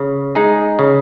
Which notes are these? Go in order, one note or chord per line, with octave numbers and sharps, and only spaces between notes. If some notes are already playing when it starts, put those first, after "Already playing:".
Already playing: C#3
G#3 D#4 G#4
C#3